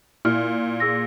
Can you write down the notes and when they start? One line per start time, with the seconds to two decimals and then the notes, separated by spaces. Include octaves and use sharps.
0.25 A#2 E4 F6
0.80 G#4 E6 A#6